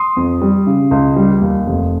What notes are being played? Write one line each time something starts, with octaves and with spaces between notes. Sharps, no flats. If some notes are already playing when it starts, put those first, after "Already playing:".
Already playing: C6 D#6
F2
G3
C#3
C#2
G3
D#2
F1